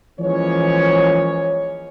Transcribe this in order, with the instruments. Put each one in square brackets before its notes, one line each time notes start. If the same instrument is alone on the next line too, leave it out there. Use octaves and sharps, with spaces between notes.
[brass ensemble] E3 F3 G#3 A#3 C#4 C#5